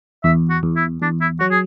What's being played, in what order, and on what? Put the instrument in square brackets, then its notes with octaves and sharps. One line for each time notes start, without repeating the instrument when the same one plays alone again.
[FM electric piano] E2 [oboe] E5
[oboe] F#4
[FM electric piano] E2
[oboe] E4
[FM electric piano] E2 [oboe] D4
[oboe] E4
[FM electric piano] F#3 [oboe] F#4
[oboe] G#4